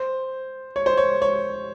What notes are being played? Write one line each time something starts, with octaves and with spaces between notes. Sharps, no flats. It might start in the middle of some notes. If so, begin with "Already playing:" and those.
Already playing: C5
C#5
C5
C#5
C#5